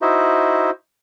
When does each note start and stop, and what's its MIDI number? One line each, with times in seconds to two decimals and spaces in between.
0.02 0.70 63
0.02 0.70 64
0.02 0.70 66
0.02 0.70 72
0.02 0.70 75
0.02 0.70 76